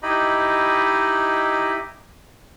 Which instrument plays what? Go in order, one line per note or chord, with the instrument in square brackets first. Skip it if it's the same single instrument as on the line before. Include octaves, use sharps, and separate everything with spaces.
[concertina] D#4 E4 G4 D#5 B5